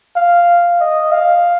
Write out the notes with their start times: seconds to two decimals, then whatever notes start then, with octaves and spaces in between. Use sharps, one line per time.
0.16 F5
0.81 D#5
1.12 F5